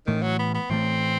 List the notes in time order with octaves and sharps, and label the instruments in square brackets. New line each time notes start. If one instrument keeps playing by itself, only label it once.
[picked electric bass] A2 E3 A3 [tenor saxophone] D#3
[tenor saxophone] F#3
B3
B3
[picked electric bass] A2 E3 A3 [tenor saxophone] C4